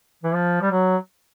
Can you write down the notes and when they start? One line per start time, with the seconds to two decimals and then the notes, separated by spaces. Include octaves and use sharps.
0.23 E3
0.34 F3
0.62 G3
0.71 F#3